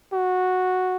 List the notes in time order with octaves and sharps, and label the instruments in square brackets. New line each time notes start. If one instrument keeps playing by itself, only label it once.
[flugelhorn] F#4